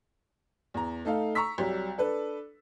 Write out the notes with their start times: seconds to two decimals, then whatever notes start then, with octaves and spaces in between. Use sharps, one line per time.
0.74 E2 A#5
1.05 A3 D#4 A4 F5
1.35 A#5 C#6 E6 B6
1.58 C2 F#3 G3
1.98 D4 A4 B4